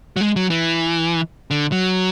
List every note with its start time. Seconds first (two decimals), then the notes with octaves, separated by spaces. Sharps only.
0.16 F#3
0.21 G#3
0.36 F#3
0.50 E3
1.51 D3
1.72 F#3